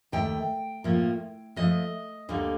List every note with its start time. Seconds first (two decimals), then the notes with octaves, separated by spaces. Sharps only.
0.12 D#2 D#3 A3 G5
0.84 A2 F3 A#3
1.56 A2 F3 A3 D#5
2.29 D2 D3 G3 A#3